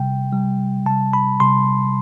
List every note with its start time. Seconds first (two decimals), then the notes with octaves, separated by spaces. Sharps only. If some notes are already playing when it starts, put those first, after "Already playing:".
Already playing: C3 G3 G5
0.33 C3 G3
0.86 C3 G3 A5
1.13 B5
1.40 C3 G3 C6